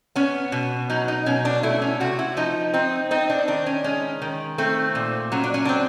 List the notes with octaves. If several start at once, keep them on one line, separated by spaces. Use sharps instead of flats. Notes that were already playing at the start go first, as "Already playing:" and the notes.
B3 C#4
B2
F#3 D#4
D#4
B2 C#4
D4
A3 E4
C#4
C3 F#4
E4
F3 D#4
C4 D#4
C4 D#4
D4
D#3 D4
C#4
G#3 C#4
D#3
A3 C4
A#2
F#3 C#4
D4
C#4
C4 D4